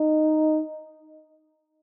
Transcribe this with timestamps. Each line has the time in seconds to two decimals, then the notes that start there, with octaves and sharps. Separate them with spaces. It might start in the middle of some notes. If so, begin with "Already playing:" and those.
Already playing: D#4